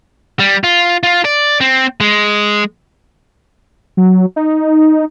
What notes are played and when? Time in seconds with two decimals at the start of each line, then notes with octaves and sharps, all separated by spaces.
0.40 G3
0.64 F4
1.03 F4
1.25 D5
1.61 C4
2.01 G#3
3.97 F#3
4.36 D#4